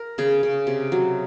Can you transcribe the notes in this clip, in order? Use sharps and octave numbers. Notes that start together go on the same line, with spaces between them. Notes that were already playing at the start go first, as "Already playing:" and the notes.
Already playing: A#4
C#3 G#4
C#3
C3
F#3